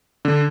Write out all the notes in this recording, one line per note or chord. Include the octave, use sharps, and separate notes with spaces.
D3